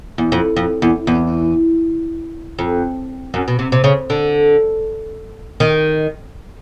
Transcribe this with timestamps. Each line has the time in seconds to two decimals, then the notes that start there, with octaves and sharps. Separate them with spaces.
0.18 E2
0.32 F2
0.56 F2
0.82 E2
1.07 E2
2.59 F2
3.34 F#2
3.48 B2
3.59 C3
3.72 C3
3.84 C#3
4.10 D3
5.60 D#3